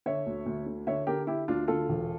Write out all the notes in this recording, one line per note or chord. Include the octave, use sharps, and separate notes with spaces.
D3 C#5 E5
D2
D2
D3
D3 C#5 E5
D3 G4 A#4
D3 E4 G4
D2 D4 F4
D3 F4 A4
E1